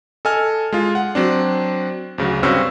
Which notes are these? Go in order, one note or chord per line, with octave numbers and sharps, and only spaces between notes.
A4 D#5 G#5 F6
G#3 F4
F#5
F#3 C4 D4
D2 C#3 F#3
G2 C4 C#4 F#4 E6